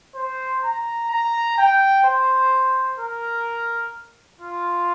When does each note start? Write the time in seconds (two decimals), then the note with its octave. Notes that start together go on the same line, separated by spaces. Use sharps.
0.15 C5
0.64 A#5
1.11 A#5
1.58 G5
2.04 C5
2.99 A#4
4.41 F4